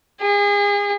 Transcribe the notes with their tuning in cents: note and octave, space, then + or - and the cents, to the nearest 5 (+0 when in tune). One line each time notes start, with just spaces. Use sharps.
G#4 -35